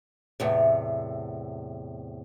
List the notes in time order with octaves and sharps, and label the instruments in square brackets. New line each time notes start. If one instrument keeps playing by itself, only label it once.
[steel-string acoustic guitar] E2 A2 C3